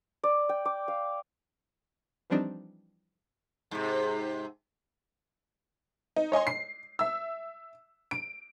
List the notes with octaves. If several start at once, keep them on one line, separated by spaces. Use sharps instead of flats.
D5
G5
D6
F5
E3 F3 G3 C4 D4 D#4
G#2 C3
D#4
C#5 D#5 G#5 C6
C7
E5 E6
D7